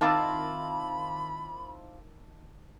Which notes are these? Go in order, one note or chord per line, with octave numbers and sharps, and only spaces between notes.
D#3 C4 E4 F4 A5 B5 D6 E6